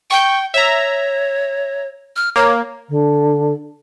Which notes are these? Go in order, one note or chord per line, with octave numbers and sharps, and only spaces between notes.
G5 C#6 G6
C#5 E5 A#5
F6
A#3 C#5
D3